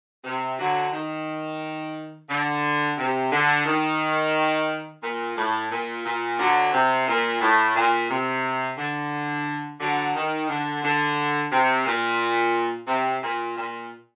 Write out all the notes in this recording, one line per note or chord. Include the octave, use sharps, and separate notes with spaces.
C3
D3 F#3
D#3
D3
C3
D3
D#3
A#2
A2
A#2
A#2
D3 F#3
C3
A#2
A2
A#2
C3
D3
D3 F#3
D#3
D3
D3
C3
A#2
C3
A#2
A#2